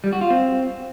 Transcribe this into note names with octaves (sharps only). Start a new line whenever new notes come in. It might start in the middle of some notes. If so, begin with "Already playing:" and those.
G3
F#4
F4
C4